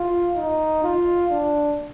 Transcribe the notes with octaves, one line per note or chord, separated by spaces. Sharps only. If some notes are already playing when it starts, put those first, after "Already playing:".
Already playing: F4
D#4
F4
D4